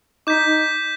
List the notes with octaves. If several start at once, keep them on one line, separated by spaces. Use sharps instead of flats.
D#4 D6 G6 B6